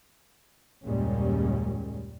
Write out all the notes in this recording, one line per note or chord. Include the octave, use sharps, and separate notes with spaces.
F#1 D#2 A#2 G3 G#3 C#4